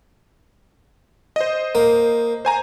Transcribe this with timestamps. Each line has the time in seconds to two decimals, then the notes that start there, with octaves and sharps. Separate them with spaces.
1.36 C5 D#5
1.75 A#3
2.45 C5 G#5 A#5